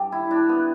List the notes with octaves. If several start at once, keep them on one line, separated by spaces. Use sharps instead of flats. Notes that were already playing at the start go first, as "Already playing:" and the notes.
Already playing: G2 F#3 G4 A4
E4
D4
B3